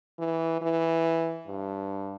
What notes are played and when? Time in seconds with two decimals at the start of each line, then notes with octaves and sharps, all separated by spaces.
0.19 E3
0.61 E3
1.47 G2